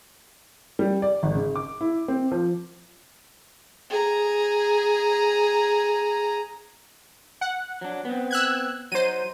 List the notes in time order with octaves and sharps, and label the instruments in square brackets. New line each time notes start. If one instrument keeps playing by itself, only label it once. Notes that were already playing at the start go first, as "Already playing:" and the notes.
[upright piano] G3
D5
G#1
C#3
D6
E4
C4
F3
[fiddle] G#4 A#5
[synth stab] F#5
[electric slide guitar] F#3 D4
B3 C4
[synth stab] E6 F#6 G#6
[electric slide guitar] F#3 D#4 [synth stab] C5 D#7